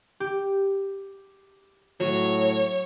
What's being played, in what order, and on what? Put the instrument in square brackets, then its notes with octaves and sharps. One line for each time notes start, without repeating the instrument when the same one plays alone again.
[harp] G4
[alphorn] A2 [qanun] F#3 [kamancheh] C#5